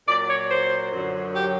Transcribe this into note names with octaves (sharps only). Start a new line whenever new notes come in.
A#2 F#3 D5
C#5
C5
F#2 D3 F#3
G4